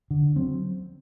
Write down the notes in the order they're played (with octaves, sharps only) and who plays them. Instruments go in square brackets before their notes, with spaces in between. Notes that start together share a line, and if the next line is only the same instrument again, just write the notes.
[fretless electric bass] D3
F#3 C4